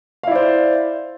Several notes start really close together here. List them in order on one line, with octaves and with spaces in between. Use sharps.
F5 E4 D5 C5